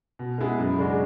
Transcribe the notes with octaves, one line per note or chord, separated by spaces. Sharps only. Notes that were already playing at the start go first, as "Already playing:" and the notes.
B2
G#3 B3 E4 G#4
F#2
C#3 G#3 D4 F#4